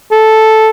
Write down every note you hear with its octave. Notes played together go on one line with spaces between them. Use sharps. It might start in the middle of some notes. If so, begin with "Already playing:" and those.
A4